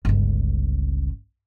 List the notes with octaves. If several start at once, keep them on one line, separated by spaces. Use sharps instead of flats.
G1 C#2